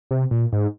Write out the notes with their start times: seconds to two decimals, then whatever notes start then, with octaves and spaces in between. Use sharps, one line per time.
0.11 C3
0.31 A#2
0.53 G#2